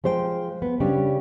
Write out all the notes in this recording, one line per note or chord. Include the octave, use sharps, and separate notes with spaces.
F3 G#3 C5 C#5 G5
B3
C#3 G3 C#4 D4